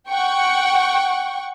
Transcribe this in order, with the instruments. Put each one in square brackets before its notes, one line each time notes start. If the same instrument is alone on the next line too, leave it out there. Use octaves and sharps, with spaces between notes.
[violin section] F#5 G5 C#6